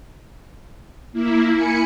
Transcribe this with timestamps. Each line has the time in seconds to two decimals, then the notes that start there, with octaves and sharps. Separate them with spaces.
1.13 A#3 E4
1.55 G#5 B5 C#7